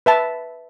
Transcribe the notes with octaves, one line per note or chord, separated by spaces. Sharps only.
B4 E5 A5